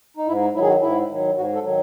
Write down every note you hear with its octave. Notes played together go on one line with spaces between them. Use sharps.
D#4
G#2 E4
D#4
D#3 F#3 E4 G#4
F#4
G#2 E4
D#3 F#3
G#2 F#4
A4
D#3 F#3